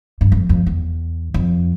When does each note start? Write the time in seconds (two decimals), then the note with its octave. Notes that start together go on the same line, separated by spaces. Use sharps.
0.21 G2
0.32 F2
0.49 F2
0.66 E2
1.34 F2